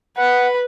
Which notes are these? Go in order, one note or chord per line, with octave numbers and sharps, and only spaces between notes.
B4 F#5